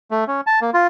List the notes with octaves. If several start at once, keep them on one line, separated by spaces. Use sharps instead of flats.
A3
C#4
A5
A#3
F4